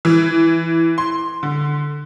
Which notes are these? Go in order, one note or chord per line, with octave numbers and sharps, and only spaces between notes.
E3
C6
D3